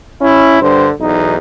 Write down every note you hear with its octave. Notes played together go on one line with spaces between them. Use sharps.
C#4 E4
G2 D3 C5
B1 E2 D#4